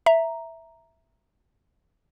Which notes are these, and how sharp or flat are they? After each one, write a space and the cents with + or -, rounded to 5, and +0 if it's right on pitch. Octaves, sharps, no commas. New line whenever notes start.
E5 +0 A#5 +0